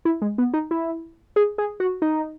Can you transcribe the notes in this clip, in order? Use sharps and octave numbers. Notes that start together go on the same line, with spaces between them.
E4
G#3
B3
D#4
E4
G#4
G#4
F#4
D#4